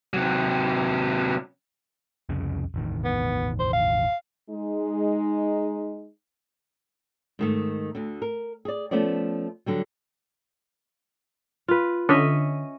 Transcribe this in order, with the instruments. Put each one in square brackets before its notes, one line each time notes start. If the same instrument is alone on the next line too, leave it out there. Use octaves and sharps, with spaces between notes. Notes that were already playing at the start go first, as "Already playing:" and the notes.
[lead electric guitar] C3 F#3
[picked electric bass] C2 F2 C#3
E1 A1 D#3
[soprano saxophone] B3
C5
F5
[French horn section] G#3 D#4
[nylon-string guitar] G#2 D#3 A3
D2 D3
A#4
G#4 D5
F3 A3 B3 C#4 D5
D3 F#3 G3
[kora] F4 B4
[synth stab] D3 [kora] C#4 D#5 E5